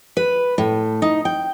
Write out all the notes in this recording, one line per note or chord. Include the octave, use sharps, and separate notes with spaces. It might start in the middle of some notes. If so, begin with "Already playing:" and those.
B4
A2
D#4
G5